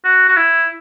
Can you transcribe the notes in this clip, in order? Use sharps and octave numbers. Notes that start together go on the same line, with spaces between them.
F#4
F#4
E4